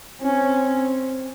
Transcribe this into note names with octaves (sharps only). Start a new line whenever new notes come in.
C4 C#4